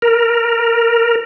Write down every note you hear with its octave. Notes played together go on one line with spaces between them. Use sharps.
A#4